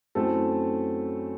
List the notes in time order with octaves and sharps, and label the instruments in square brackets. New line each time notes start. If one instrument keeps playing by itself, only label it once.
[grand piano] F#2 F#3 A3 C4 E4 A4